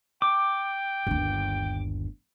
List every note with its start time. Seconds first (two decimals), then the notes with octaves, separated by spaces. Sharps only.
0.22 G5 D6
1.07 G1 D#2